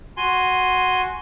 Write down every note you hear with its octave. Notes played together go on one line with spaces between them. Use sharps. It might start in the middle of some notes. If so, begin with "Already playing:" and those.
F#4 G#5 C6